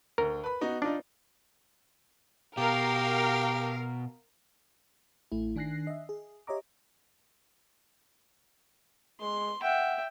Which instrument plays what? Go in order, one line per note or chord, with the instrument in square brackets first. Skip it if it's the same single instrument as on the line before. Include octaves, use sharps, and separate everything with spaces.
[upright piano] D2 [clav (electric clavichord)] A#4
[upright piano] B4 B5
B3 D#4 F#4
[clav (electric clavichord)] D4 [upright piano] D#4 F4 D5
[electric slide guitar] B2 [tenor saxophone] G4 [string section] A#4 F5
[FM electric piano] A1 A3 E4
D#3 D4 G#5 F#6 A#6 C7
D#5 E5
G#4
G4 C#5 D#5 E5 A#5 D6
[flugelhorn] G#3 [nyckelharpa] C6
[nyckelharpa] E5 G5 [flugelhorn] F#5